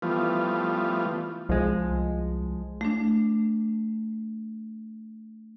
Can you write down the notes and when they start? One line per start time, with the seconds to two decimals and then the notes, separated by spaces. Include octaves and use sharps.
0.02 E3 F3 G3 A3 B3 F4
1.49 C2 F3 G#3
2.81 A3 D4